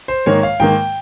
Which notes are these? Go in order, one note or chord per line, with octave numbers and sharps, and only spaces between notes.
C5
G#2 D#3 A#3 C#5
F5
G#2 D#3 A#3 G5